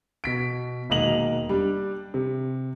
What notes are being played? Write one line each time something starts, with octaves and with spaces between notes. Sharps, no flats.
B2 B6 D7
E1 D#3 A#3 D#5 F7 F#7
G3 D4
C3